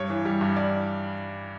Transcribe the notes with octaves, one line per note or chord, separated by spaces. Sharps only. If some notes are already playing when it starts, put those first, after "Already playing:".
Already playing: G2 C#5
E3
G3
G2
D5